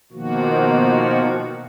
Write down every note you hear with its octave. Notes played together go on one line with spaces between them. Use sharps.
B2 D#3 F3 A#3 F#4